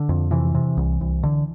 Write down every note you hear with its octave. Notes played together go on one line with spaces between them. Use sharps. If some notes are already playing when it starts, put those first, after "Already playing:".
Already playing: D3
F2
C3 E3
C3
C2
C2
D3